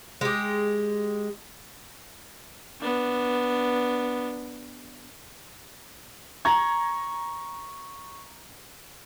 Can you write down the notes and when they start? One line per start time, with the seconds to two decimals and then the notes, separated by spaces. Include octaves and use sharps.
0.21 G#3 G4
2.80 B3 D4
6.45 A#5 C#6 G#6